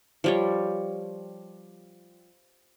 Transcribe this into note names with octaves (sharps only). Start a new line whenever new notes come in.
F3 G3 C#5